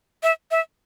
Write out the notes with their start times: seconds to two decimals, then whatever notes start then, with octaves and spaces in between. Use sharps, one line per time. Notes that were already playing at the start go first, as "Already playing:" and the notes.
0.23 E5
0.51 E5